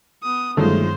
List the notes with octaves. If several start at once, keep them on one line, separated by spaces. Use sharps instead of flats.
B3 D#6
G1 D#3 F#3 G#3 A3 F4 C5